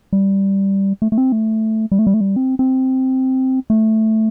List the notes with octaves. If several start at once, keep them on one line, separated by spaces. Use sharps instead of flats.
G3
A3
A3
C4
A3
G3
A3
G3
A3
G3
C4
C4
A3